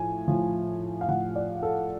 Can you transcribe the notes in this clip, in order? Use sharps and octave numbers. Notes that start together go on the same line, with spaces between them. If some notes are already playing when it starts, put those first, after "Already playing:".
Already playing: A2 F3 G#5
A2 F3
F5
A2 F3 F#5
D5
A4